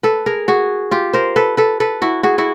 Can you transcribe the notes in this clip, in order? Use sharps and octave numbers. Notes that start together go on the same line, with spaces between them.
A4 B4
G#4 A#4
F#4 G#4
F4 G4
A#4 C5
A4 B4
A4 B4
A4 B4
E4 F#4
F#4 G#4
E4 F#4